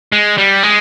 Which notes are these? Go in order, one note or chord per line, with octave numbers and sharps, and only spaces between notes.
G#3
G3
G#3